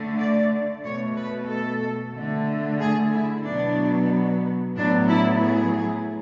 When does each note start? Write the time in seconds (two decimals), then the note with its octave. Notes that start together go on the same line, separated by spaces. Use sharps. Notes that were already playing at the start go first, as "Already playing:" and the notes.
Already playing: D3 A3
0.18 D5
0.84 B2 A3 C#5
1.16 B4
1.49 A4
2.14 D3 A3
2.80 G#4
3.13 E4
3.45 B2 F#3 B3 D4
4.77 A2 F#3 B3 D4
5.09 E4
5.42 G#4